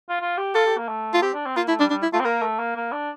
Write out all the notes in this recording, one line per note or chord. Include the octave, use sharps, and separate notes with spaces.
F4
F4
G4
F4 A4
G4
A#3
A3
F4
C4 G4
D4
C4
A#3 F4
A3 E4
G3 D4
G3 D4
E4
A3 F4
C4
A#3 A#4
A3
A#3
A#3
D4